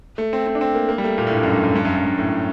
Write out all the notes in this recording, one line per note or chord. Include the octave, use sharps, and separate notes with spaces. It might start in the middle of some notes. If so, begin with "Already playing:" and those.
A3
C4
C4
D4
C4
A#3
A#3
G3
A3
A#2
A2
G2
F#2
G2
F#2
G2
F#2
F#2
G2
A2